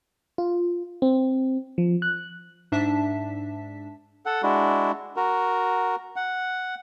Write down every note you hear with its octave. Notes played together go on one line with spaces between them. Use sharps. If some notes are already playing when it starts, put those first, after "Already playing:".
F4
C4
F3
F#6
G#2 D4 E5 A5 B6
A4 F#5
G#3 D4 E4 F#4
F#4 A#4
F#5